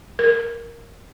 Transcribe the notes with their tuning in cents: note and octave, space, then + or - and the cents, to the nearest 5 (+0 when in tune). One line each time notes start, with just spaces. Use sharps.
A#4 +0